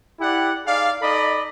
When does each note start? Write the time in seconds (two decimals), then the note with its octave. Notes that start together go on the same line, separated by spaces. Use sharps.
0.20 E4 G4 D5 F#5
0.65 D#4 G#4 D5 F5
1.01 D#4 A4 D5 D#5 B5